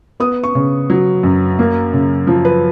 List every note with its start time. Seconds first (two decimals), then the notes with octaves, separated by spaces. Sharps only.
0.20 B3 D#6
0.44 C#6
0.55 C#3
0.90 F#3
1.23 F#2
1.59 A#3
1.93 C#3
2.27 F3
2.45 B4